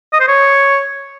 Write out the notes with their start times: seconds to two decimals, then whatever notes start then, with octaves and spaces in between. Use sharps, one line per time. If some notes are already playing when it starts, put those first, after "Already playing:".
0.13 D#5
0.20 C5
0.28 C#5